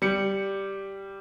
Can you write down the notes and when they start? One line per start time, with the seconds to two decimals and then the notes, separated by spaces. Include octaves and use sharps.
0.02 G3 C#7